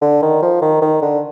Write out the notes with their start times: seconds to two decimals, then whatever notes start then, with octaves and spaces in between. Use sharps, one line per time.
0.02 D3
0.22 D#3
0.42 F3
0.62 D#3
0.82 D#3
1.02 D3